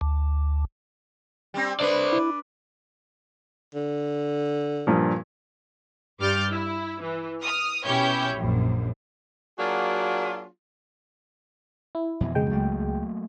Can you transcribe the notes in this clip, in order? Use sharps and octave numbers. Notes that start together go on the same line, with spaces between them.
D2
G3 C4
D4 B4 C5 D5
E4
D3
G2 A#2 F3
G2 G3 D6 F6 G6 A6
E4
E3
D#6 F6
B2 C#4 E4 G4 C#5 G6
A#1 F#2
F#3 A#3 D4 F4 F#4 G#4
E4
F2 B2 E3
C#2 G#3 G5
F#3 A3 A#3